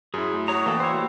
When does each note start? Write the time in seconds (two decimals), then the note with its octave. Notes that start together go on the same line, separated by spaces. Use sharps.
0.14 F#2 E4 F#4 G#4
0.33 A3
0.48 F#4 C#5 A#5 D#6
0.66 E3 A#3 A4 D5 F5 G5
0.80 C5 C#5 G5 B5 E6
0.94 A#3 G4